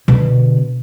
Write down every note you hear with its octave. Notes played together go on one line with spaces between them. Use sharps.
B2 D3